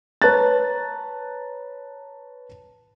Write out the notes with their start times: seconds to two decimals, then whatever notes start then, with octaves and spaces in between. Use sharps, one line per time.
0.22 B4 C#5 A5 A#5 F#6 A6